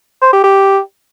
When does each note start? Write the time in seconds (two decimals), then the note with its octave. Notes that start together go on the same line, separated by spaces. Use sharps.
0.22 C5
0.33 G4
0.44 G4